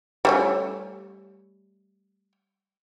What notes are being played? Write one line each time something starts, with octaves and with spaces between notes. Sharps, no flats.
G3 A3 C#4